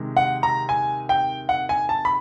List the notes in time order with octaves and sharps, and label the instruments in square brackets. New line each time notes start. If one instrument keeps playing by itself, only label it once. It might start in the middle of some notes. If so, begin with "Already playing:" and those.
Already playing: [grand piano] C3 D#3 G#3
F#5
A#5
G#5
G5
F#5
G#5
A5
B5